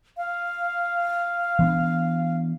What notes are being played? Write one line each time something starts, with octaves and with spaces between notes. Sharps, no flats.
F5
E3 B3 D4